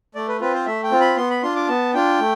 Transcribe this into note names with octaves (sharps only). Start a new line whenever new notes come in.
A3 D5
B4
C4 F4 B4
C5
A3 E5
G5
C4 F4
B5
B3 C6
B5
D4 F4 C6
D6
B3 A5
D4 F4 G5
A3